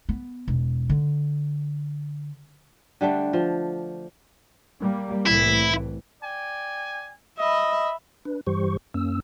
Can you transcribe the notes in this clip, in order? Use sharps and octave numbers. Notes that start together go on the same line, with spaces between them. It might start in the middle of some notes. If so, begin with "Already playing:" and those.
B3
E1
D3
D3 G3 A3 D4
F3
G3 A#3
C2 A2 E3 E4
D5 G5 G#5
D#5 E5 B5
D4 B4
G2 E3 G3 G4 C5 C#6
F#2 A#3 C#4 E6